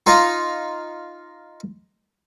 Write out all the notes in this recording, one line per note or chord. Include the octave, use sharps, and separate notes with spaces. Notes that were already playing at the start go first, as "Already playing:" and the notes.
D#4 F4 D#5